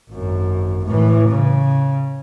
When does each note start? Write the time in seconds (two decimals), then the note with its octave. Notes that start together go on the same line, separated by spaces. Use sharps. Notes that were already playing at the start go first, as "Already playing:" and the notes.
0.10 G#1 F#2
0.85 A2 E3
1.28 C#3